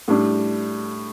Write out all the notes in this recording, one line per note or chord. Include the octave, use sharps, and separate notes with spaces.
A2 G3 D4